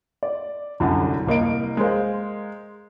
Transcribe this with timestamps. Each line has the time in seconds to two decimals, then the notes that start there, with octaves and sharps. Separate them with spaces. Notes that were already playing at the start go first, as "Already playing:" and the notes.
0.23 D5
0.80 C2 F#2 D3 F#4 F#5 A5
1.27 C2 A#3 D#5 D7
1.77 G#3 G#4 A#4 C5 F5